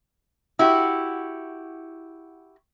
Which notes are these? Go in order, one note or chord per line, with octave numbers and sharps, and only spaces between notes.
E4 F#4 G4